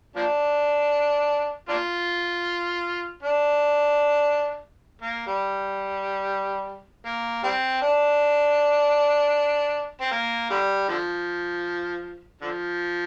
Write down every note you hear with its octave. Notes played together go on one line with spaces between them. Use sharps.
F3 A#3 D4
A#3 D4 F4
D4
A#3
G3
A#3
G3 C4
D4
C4
A#3
D3 G3
D3 F3
D3 F3